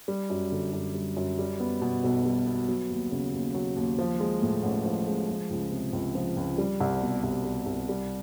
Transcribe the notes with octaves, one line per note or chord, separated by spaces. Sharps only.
G3
F#2
D3
F#2
G3
F#2
G3
B3
B2
B1
G3
B3
F#3
D#2
C#3
D#2
F#3
D#2
F3
G#3
A2
A1
F3
G#3
F3
C#2
C3
C#2
F3
C#2
G3
C2
B2
C2
G3
C2
G3